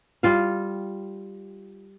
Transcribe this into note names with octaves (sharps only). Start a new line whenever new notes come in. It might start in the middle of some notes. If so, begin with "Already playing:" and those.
G3 F4 F5